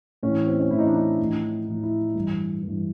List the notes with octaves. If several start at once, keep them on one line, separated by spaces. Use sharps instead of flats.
A2 E3 C#4
C4
C#4
A2 E3 E4
D#4
D4
D#4
A2 F3
A2 F3 E4
E4
G2 E3
G2 E3